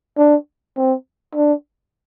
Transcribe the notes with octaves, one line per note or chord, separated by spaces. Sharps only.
D4
C4
D4